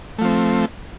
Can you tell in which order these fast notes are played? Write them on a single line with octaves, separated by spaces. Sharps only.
A3 F3 C4